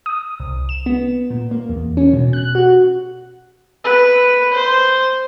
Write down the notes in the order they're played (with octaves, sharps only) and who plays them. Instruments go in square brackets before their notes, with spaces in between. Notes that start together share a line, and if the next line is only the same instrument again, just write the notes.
[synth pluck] D#6
C2
E7
B3
A#2
A#3
E2
C#4
B2
F#6
F#4
[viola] B4
C5